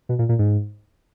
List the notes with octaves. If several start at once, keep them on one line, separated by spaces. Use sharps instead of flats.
B2
A#2
A#2
G#2